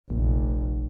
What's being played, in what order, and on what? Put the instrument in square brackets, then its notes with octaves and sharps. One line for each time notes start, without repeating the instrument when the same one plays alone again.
[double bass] F1 [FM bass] A#1